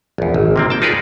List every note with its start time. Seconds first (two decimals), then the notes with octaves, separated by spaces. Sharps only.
0.18 A#1 E2
0.34 G#1
0.56 C3 A#3 C4
0.70 G5 A5
0.82 D#4 F4 G#4 A#4 B4 D5